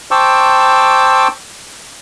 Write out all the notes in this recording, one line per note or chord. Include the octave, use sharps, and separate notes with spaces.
C5 G5 A5 C#6 D6 E6